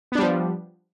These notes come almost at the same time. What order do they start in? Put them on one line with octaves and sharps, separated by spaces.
B3 D4 G3 F3